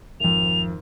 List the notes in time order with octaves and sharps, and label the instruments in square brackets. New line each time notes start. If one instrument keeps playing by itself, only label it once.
[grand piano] G#1 F2 [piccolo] F7